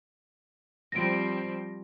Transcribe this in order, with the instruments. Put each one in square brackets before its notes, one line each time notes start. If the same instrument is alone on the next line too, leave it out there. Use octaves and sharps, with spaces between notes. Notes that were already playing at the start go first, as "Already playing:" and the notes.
[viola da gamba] F3 G3 C4 [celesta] A#6 D7